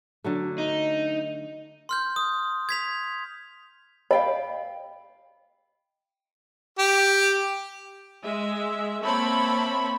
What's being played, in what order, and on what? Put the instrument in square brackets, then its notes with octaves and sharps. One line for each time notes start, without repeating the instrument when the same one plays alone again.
[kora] D3 F#3 A3
[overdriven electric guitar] D#4
[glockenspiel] C6 F6 G6
D#6
G#6 B6 F7
[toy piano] D#5 [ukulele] F5 G5 B5
[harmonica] G4
[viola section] G#3 E5
A#3 C4 C#5 E5 A5 B5